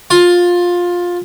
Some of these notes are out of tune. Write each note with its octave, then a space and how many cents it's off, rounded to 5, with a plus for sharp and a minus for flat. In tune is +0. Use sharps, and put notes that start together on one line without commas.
F4 +15